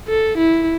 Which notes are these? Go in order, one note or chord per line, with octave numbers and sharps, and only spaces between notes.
A4
E4